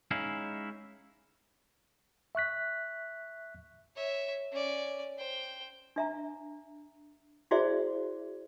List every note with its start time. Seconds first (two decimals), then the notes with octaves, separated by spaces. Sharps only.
0.11 G#3 C#4 D#4 E4 F5
2.35 E5 C#6 F#6 B6
3.95 C#5 E5
4.52 C#4 D5
5.18 C5 G5
5.96 D4 E5 A#5
7.51 E4 F#4 G#4 C5 D5 E5